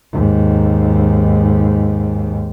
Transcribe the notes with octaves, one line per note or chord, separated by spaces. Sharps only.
D#2 G#2